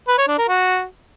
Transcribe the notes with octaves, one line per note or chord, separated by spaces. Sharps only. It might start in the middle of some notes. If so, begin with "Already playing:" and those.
B4
C#5
D4
A#4
F#4